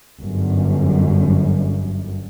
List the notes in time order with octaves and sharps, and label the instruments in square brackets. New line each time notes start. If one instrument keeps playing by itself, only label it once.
[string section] G1 F#2